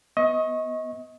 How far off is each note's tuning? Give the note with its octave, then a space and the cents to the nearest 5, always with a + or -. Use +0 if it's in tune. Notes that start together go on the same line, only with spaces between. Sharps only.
B3 +0 D#5 +25 C#6 -20